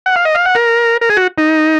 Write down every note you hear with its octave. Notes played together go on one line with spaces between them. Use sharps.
F#5
F5
D#5
F5
F#5
A#4
A#4
G#4
F#4
D#4